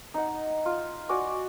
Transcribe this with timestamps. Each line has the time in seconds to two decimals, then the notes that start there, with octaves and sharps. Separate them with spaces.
0.14 D#4 F#5
0.66 F4
1.09 F#4 D5 G#5